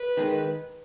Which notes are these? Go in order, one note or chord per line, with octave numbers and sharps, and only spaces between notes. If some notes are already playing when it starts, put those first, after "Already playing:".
Already playing: B4
D#3 G#3